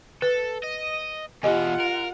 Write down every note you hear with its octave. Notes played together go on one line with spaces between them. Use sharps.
A4 B4
D#5
E2 B2 F4 G4 D#5 F#5 G#5
A#4